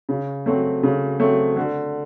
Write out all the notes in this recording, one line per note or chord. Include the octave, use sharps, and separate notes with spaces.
C#3
F#3 A3 C4
C#3
F#3 A3 C4
D3